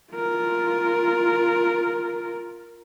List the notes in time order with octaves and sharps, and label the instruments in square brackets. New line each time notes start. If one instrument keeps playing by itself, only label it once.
[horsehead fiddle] F4 A#4